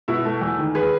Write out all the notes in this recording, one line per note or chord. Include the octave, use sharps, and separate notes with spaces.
B2 E4
A3
E2
D#3
G#4 B4